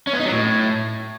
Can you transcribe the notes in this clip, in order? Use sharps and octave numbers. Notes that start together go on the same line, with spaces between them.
C#4
B3
D#4
F#3
A2